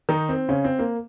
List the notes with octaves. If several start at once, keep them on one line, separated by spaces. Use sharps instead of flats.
D#3 D#4
C4
C#3 C#4
C4
A#3